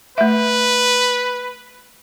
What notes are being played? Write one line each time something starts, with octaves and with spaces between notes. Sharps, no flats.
A3 B4 E5